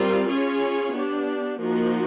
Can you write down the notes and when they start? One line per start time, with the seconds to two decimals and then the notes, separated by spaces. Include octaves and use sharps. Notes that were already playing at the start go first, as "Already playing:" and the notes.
Already playing: G3 C4 F4 A#4
0.31 C#4 F4 G#4 C#5
0.95 B3 D4 G4
1.61 F3 A#3 D#4 F#4